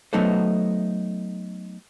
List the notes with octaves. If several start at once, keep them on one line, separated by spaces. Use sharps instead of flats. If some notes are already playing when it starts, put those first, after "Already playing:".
F#3 A3 B3 D#4 A4 C5